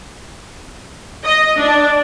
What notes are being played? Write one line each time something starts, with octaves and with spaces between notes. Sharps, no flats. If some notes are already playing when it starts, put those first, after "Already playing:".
D#5
D4